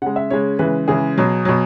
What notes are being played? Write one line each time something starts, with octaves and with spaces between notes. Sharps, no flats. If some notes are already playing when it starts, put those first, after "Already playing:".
C#3 G#3 F#5
E5
C#3 G#3 C#5
C#3 E3 G#3 B4
C#3 E3 G#3 G#4
B2 F#3
B2 F#3